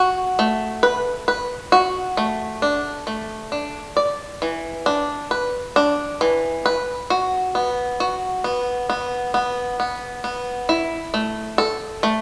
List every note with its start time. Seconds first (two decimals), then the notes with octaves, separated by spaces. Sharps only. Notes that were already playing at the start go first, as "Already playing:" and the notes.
Already playing: F#4
0.39 A3
0.83 B4
1.28 B4
1.72 F#4
2.17 A3
2.62 D4
3.07 A3
3.52 D4
3.97 D5
4.42 E3
4.86 D4
5.31 B4
5.76 D4
6.21 E3
6.66 B4
7.10 F#4
7.55 B3
8.00 F#4
8.44 B3
8.90 B3
9.34 B3
9.80 B3
10.24 B3
10.69 E4
11.14 A3
11.58 A4
12.03 A3